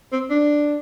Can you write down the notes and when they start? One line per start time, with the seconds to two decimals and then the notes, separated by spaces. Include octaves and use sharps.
0.12 C4
0.30 D4